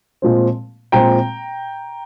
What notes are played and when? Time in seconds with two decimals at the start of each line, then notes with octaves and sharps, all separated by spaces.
0.22 A#2 F3 G#3 C4
0.92 A#2 F3 G#3 C4 G5 A#5